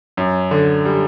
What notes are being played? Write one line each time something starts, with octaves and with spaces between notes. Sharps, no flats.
F#2
D3
G3